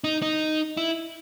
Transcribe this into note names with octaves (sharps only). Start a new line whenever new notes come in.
D#4
D#4
E4